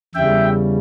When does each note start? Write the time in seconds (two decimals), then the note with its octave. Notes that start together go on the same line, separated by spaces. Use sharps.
0.15 E2 C#3 G3 E5 G5